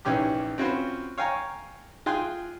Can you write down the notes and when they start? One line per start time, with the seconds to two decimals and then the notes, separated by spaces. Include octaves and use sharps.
0.05 A#1 G#2 E3 C#4 G4 D6
0.58 C4 C#4 F4 F#4 B4 C5
1.18 C#5 F5 G5 G#5 A#5
2.06 F4 G#4 G5 G#5 C6 F#6